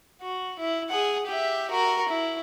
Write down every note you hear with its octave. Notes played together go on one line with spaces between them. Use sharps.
F#4
E4
G#4 F#5
G4 E5
F#4 A#4
E4